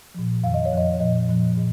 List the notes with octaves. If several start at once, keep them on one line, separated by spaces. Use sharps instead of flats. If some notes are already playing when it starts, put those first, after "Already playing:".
A#2 F3
F2 D#3 F5
D#5
C#5
F2 F3 D#5
A#2 F3 D#5
A#2 F3
A#2